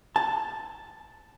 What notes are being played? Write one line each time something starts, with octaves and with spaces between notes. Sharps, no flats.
A5